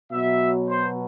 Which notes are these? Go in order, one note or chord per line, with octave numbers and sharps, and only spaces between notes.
B2 F#3 E5
C5